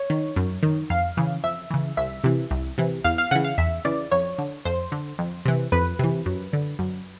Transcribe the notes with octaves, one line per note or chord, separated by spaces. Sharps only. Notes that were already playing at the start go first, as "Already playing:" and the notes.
Already playing: C#5
D#3
F#2
D#3
F2 F5
C#3 E3
F2 E5
C#3 E3
C2 E5
C3 E3
C2
C3 E3
E2 F5
F5
C#3 E3 F#5
F5
E2 E5
C#3 E3 D5
F2 C#5
D3
F2 C5
D3
F2
C3 E3
F2 B4
C3 E3
F#2
D3
F#2